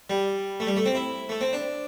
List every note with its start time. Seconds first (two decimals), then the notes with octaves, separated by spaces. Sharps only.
0.10 G3
0.60 A3
0.67 G3
0.77 A3
0.86 C4
0.95 E4
1.29 A3
1.41 C4
1.53 D4